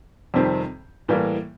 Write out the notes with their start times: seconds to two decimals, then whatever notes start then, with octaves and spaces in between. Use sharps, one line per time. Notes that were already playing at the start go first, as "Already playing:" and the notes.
0.34 F2 C3 D#3 G3 C4
1.08 A2 E3 G3 A#3